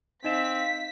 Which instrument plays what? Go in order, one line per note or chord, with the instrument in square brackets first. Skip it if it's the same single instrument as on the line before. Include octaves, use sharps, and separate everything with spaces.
[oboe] C4 [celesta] D#4 D#5 E7 [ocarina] F5 [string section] B6